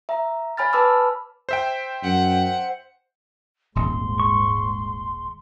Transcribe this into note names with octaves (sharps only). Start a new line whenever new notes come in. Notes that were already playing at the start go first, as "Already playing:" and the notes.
E5 A#5
C#5 G#5 B5 F6 A6
B4 A5 B5 D6 E6 F6
C5 E5 G5
F#2 F#5
D#1 G#1 G#2 C6
C#6